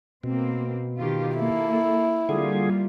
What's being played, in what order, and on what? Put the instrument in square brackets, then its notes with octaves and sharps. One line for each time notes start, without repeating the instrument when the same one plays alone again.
[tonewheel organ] B2 [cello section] A#3 C4
[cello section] D#3 F4 G4
[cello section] A#3 A4 [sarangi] E4
[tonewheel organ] D3 G#4 [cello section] G3 A#3 F4